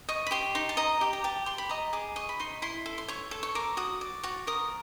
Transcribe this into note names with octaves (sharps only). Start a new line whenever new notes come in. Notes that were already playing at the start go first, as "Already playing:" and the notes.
D#5 C#6
B5
G4 C6
D#4 C6
A5
D#5 A#5
G4
A#5
G4 A5
G4 C6
B5
D#5 A#5
G#4 D6
D#5 C#6
B5
D#4 C6
E4 C6
A4
C6
C#5 C#6
A4
C#6
A#4 D6
F#4 D#6
D5
F#4 C#6
A#4 D#6